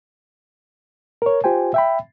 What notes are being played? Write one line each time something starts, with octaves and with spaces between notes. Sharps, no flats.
A#4 C#5
F4 G4 C5 G5 G#5
E5 G5 B5